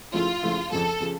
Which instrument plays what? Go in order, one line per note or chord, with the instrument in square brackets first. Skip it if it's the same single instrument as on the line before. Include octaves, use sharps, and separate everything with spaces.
[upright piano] C#3 F3 A3 E4 [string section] F4
[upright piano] C#3 F3 A3 E4
[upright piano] F2 C#3 F3 [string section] A4
[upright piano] C#3 F3